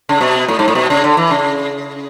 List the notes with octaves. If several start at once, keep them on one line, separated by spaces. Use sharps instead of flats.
C#3
B2
A2
G#2
A2
B2
C#3
D3
E3
C#3